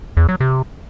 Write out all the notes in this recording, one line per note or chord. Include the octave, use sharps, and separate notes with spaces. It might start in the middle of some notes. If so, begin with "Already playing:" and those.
E2
F#3
C3